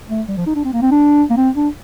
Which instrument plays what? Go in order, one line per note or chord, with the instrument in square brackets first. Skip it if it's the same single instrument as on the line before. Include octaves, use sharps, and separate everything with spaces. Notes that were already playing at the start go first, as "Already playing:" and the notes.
[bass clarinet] A3
G3
F3
D#4
D4
C4
A#3
C4
D4
A#3
C4
D4